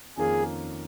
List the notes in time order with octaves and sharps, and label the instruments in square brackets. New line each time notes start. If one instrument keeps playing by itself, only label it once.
[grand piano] F2 D#3 A#3 C#4 F4 [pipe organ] G#4